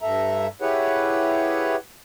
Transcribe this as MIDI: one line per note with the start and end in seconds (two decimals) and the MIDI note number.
0.02 0.47 43
0.02 0.47 69
0.02 0.47 76
0.02 0.47 82
0.61 1.76 64
0.61 1.76 67
0.61 1.76 68
0.61 1.76 71
0.61 1.76 73
0.61 1.76 78